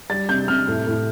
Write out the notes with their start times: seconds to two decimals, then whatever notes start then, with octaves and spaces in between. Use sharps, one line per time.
0.10 G3 A6
0.29 C3 G6
0.48 C3 F6
0.68 A2
0.87 A2